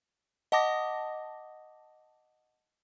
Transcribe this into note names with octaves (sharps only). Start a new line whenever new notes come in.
D#5 F#5 A5 D6 D#6 A#6